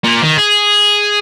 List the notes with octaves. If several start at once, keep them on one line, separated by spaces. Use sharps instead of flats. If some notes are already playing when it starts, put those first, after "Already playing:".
A#2
D#3
G#4